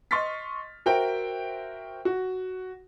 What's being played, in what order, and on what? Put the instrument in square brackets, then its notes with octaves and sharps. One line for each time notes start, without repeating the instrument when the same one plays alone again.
[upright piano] D#5 C6 C#6 F6 A6 B6
F#4 A#4 C5 E5 G5
F#4